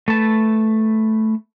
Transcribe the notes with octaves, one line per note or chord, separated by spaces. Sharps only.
A3 B4 A5